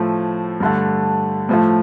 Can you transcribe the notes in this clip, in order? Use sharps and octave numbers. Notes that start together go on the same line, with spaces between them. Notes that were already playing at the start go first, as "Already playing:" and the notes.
Already playing: A2 F3 A3
G2 D3 A3
A2 F3 A3